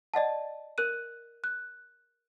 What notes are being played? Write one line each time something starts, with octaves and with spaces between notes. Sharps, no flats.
D5 D#5 F#5 A5
A#4 F#6 D#7
F#6